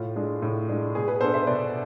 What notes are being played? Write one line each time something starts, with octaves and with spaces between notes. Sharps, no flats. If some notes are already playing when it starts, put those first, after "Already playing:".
Already playing: A2 F4
G#3 D4
A2
G#3 D4
B2 G#4
G#4 B4
B3 D4 A4 C5
C5 E5
B2 B4 D5